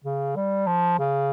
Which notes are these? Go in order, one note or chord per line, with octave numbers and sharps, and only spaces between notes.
C#3
G3
F3
C#3